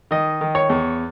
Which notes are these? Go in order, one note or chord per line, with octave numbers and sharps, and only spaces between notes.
D#3 D#5
D#3
C#5
E2